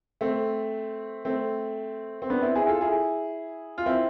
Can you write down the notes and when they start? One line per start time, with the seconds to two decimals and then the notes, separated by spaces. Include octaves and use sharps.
0.21 A3 C4
1.25 A3 C4
2.22 C4
2.30 B3 D4
2.42 C4 E4
2.55 E4 G#4
2.68 F4 A4
2.81 E4 G#4
3.78 F4
3.86 C4 E4